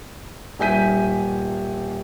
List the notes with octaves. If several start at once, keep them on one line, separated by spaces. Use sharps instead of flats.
D#1 E5 G#5 G6 B6 D#7